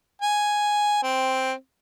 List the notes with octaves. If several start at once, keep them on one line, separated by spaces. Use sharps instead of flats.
G#5
C4